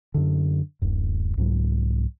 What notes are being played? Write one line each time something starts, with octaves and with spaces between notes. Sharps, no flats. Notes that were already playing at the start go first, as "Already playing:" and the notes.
F#2 D3
D1 F#2
C2 G#2 F#3